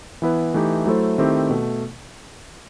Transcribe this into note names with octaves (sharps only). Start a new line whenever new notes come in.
E3 B3 E4 B4
E3 A3 D#4 G4
F#3 A3 E4 A4 C5
D#3 A3 C4 E4 G4
B2 A3